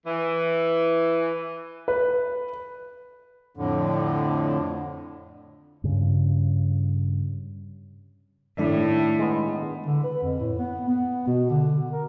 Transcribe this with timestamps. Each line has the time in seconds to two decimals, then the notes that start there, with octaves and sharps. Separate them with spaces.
0.06 E3
1.88 B4
3.57 F2 A2 D3
5.84 G2 C#3
8.58 A2 D#3 D4 E4 D5
9.19 G#3 B3
9.86 D3
10.03 B4
10.22 F2
10.39 A2
10.58 B3
10.88 B3
11.27 B2
11.50 D3
11.93 A#4